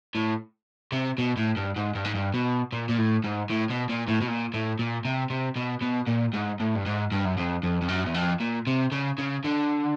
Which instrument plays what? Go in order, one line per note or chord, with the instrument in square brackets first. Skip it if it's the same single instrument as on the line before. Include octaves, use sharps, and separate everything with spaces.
[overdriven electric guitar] A2
C3
B2
A2
G2
G#2
G2
G#2
G2
B2
A#2
A#2
A2
G#2
A2
B2
A#2
A2
B2
A#2
A2
A#2
C3
C3
B2
B2
A#2
G#2
A2
G2
G#2
G2
F#2
F2
F2
F2
F#2
E2
F2
A#2
C3
C#3
C#3
D3